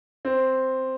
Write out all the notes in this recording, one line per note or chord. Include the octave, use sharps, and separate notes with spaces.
C4